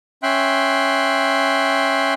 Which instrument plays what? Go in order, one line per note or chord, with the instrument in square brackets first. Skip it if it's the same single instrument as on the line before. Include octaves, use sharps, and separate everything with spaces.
[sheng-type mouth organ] C#4 E5 G5 C6 F#6